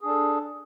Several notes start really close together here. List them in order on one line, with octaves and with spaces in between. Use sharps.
G#4 D4 A4